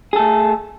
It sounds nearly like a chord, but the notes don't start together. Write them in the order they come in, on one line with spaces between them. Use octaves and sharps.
G#4 A4 A3